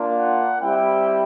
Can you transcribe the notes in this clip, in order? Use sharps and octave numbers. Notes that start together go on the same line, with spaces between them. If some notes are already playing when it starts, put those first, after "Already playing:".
Already playing: A#3 D4 F4
F#5
G3 C4 E4 G4 G5